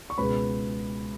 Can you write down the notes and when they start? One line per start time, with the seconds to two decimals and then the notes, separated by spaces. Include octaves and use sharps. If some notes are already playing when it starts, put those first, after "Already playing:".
0.10 C#6
0.18 C#2 B2 G#3 B4 B5